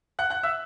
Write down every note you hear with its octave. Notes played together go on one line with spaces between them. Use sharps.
F#5 F#6
F#5 F#6
E5 E6